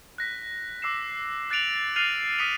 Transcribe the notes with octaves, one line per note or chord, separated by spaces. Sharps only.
F#6 A#6 B6
D6 E6 C7 E7
F#6 A6 C#7 D7 F7 F#7
F6 F#6 A6 C7 D#7 F7
D#6 F6 B6 C#7 D#7 F7